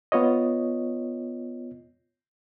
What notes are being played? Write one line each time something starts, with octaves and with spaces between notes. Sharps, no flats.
B3 F4 C#5 D#5